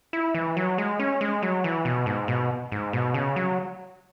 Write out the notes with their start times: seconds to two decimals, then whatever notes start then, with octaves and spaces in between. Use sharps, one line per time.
0.13 E4
0.35 E3
0.57 F#3
0.78 G#3
1.00 C#4
1.21 G#3
1.42 F#3
1.64 E3
1.85 B2
2.06 G#2
2.28 B2
2.72 G#2
2.93 B2
3.14 C#3
3.36 F#3